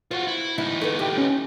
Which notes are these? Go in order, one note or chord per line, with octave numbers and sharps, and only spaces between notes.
F4 F#4 C5
E4
D2 D#4 E4
A3 B3
G4
C#4